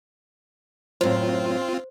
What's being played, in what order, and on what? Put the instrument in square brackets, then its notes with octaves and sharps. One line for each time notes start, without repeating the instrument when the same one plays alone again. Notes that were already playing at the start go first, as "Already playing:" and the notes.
[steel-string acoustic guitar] F#2 A2 [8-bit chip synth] C4 F4 [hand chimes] C5